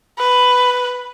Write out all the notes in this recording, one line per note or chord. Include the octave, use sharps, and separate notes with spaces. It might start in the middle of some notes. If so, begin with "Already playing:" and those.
B4